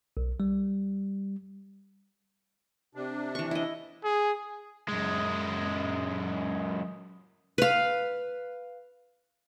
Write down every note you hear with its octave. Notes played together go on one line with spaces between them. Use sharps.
B1
G3
C3 D4
E3 C#6
E4 D#5
G#4
F#2 G#3
B4 F5